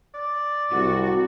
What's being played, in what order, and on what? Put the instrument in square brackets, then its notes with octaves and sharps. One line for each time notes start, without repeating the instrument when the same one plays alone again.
[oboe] D5
[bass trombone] C2 [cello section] F#4